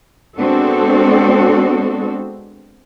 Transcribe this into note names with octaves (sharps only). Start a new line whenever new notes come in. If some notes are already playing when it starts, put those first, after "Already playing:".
G#3 B3 C4 D4 F#4 A4